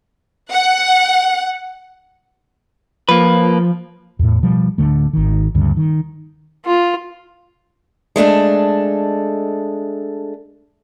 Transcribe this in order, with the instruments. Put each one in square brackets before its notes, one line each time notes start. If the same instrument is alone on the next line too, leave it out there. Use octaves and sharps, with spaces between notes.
[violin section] F#5
[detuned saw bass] F3 [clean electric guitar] A#3 B4
[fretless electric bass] E2 A2
B2 F3 G3
D1 C2 D3 A3
G#1 D#3
D2 G2 C#3
D#3
[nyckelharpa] F4
[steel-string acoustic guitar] G#3 A3 D4 A4